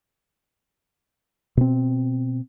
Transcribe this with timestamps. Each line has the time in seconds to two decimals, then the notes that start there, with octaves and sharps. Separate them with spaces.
1.57 B2 C4